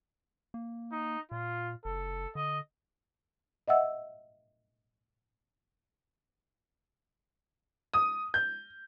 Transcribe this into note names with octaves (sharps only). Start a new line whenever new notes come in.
A#3
D#4
A#2 F4
F#1 A4
D3 D#5
D#5 E5 F#5 E6
D#6
G6